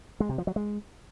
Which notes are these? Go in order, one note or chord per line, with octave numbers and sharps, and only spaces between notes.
G#3
C3
F3
F#3
G#3